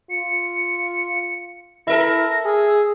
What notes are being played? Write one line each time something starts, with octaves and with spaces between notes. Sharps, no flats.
F4 C#7
E4 A4 A#4 E5 A#6
G#4 E6